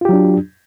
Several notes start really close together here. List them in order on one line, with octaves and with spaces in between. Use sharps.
F4 G4 F#3 D4